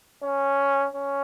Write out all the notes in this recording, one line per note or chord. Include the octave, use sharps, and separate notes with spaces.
C#4
C#4